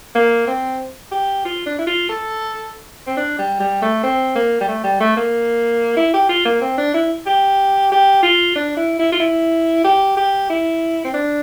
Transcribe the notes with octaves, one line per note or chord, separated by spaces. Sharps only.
A#3
C4
G4
F4
D4
E4
F4
A4
C4
D4
G3
G3
A3
C4
A#3
G3
A3
G3
A3
A#3
E4
G4
F4
A#3
C4
D4
E4
G4
G4
F4
D4
E4
E4
F4
E4
G4
G4
E4
C4
D4